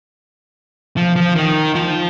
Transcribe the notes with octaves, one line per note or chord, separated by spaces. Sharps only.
F3
F3
D#3
F3